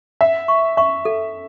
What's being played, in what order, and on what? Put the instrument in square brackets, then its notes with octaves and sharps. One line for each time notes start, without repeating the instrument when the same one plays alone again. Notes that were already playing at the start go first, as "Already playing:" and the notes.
[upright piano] E5 [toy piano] F#5
[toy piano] C#6
[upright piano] E5 [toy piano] C#6
[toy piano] A4